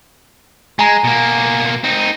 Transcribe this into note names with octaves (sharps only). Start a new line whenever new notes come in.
G#3 G#5 A#5
B2 A#3
C4 D#4